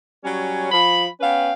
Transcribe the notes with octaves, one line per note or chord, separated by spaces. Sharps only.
F#3 G3 C#4
F3 B5
B3 C#4 B4 F5 G5